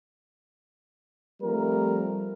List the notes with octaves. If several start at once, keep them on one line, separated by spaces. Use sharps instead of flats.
F3 G3 A3 C4 G4 A#4